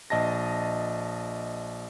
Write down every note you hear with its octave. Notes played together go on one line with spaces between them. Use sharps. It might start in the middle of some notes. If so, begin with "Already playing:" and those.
A#1 D#5 A5 A#6